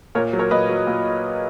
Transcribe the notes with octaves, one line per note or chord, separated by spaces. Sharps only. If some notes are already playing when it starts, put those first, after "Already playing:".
A#2 A#4 C#5
F#3
A#4 C#5
A#2 B4 D#5
F#3
A#2